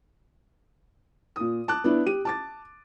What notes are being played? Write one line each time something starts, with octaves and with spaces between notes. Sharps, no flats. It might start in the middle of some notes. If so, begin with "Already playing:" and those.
A#2 D#6
A5 D6 F#6
B3 D4 E4
G4 D#7
A5 D6 A6